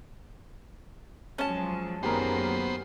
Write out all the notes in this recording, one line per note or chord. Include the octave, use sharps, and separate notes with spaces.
F3 F#3 G#3 C#4 A5
F#2 D#3 A#3 B3 G4 G#4 A#4 C5